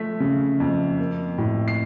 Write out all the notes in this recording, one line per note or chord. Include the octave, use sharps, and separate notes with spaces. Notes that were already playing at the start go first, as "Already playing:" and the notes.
Already playing: F3 A3 B6
C#3
F2
A#3
A2
C7